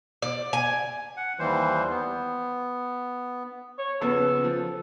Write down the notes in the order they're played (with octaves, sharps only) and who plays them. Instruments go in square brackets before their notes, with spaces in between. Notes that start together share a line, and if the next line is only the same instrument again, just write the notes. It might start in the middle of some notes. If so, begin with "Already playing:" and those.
[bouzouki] D5
G#5
[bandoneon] F#5
D#2 E3 G3 C5
B3
[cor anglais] C#5
[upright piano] C#3 F3 B3 [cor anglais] A4
[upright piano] F3